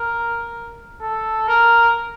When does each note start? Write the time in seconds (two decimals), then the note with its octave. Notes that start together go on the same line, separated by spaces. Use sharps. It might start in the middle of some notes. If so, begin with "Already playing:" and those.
Already playing: A#4
1.02 A4
1.48 A#4